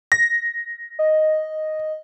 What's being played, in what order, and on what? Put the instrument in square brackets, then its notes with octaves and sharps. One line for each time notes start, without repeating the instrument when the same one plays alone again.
[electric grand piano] A#6
[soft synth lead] D#5